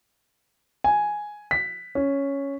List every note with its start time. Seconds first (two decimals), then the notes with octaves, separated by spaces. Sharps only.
0.84 G#5
1.51 B6
1.95 C#4